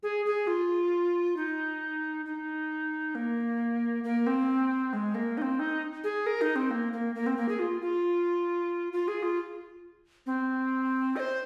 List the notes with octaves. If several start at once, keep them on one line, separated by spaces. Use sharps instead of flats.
G#4
G#4
F4
D#4
D#4
A#3
A#3
C4
G#3
A#3
D#4
C4
D#4
G#4
A#4
D#4
C4
A#3
A#3
A#3
C4
A#3
G#4
F4
F4
F4
G#4
F4
C4
D#5
C5